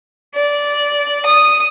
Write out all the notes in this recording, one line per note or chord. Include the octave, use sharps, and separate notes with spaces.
D5
D#6